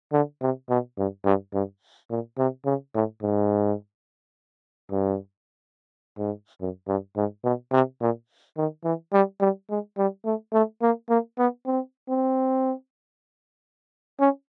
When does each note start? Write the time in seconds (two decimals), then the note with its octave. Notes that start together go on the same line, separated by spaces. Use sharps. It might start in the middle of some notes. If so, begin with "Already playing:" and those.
0.12 D3
0.42 C3
0.69 B2
0.98 G2
1.25 G2
1.53 G2
2.10 A#2
2.38 C3
2.66 C#3
2.95 A2
3.22 G#2
4.91 G2
6.17 G#2
6.60 F#2
6.87 G2
7.16 G#2
7.44 B2
7.72 C3
8.01 A#2
8.57 D#3
8.84 E3
9.13 G3
9.40 G3
9.70 G#3
9.98 G3
10.25 A3
10.53 A3
10.82 A#3
11.09 A#3
11.38 B3
11.66 C4
12.09 C4
14.20 C#4